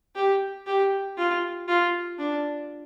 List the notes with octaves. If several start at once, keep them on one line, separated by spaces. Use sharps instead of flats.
G4
G4
F4
F4
D4